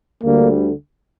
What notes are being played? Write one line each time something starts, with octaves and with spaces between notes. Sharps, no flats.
D2 D3 G3 A#3